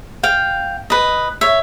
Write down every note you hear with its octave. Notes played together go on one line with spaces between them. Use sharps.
F5 G5
B4 D#5
C#5 E5